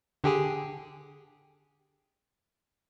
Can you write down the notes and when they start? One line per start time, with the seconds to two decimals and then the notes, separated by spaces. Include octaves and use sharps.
0.24 D3 G4 G#4